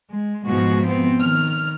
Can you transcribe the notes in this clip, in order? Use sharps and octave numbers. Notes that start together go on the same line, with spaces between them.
G#3
G#2 B2 F3 G#3 F#4
B3 C4
D#3 F6